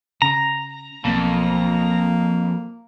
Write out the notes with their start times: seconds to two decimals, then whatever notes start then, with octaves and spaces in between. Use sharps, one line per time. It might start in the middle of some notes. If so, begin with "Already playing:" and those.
0.22 C#3 A#5
1.05 B1 F2 A#3 B3